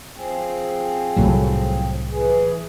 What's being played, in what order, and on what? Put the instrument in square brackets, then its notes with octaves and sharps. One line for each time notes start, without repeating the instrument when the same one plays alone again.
[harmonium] F3 C4 G#4
[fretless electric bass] C2 A2 F#3
[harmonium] E3 G#4